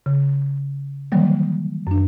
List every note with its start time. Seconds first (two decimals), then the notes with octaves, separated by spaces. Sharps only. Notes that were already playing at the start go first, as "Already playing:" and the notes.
0.06 C#3
1.12 D#3 E3 F#3 G3 A#3
1.87 F#2 D4